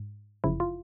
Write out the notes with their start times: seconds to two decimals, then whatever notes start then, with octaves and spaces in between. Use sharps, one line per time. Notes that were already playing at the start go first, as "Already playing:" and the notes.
Already playing: G#2
0.44 G1 F#2 C#3 F3 E4
0.60 F4